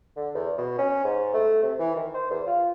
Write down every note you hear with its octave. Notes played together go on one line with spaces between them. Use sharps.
D3
E2
B2
C#4
G#2
A3
C3
E3
D#3
C5
E2
F4